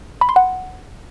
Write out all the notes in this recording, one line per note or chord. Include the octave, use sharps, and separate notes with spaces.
B5
C6
F#5